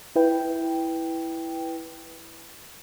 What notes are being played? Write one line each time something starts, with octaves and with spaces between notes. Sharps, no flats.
E4 B4 G5